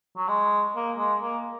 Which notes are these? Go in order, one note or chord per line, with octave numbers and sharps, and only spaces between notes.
F#3
G#3
A#3
G#3
A#3